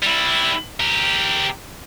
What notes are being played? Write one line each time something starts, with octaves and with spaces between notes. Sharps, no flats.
G3 E4
G4 A#4